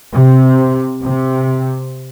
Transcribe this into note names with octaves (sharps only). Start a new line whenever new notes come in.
C3
C3